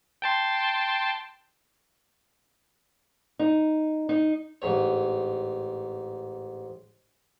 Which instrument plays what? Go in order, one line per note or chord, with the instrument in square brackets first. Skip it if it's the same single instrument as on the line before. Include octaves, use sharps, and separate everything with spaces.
[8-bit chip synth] G5 A5 C6
[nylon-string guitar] D#4
D#4
[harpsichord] A1 G#2 C#5